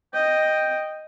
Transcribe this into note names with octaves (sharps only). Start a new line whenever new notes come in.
D#5 G5